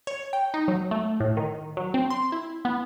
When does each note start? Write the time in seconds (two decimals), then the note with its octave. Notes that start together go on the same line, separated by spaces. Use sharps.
0.07 C#5
0.33 G5
0.54 D#4
0.68 F#3
0.91 A3
1.20 A2
1.37 D#3
1.77 F#3
1.94 C4
2.10 C6
2.32 E4
2.65 B3